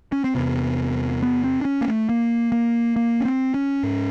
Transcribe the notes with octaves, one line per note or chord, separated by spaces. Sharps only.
C#4
C4
E2 C3 B3
B3
C4
D4
C#4
A#3
A3
A#3
A#3
A#3
C#4
C4
C#4
G#2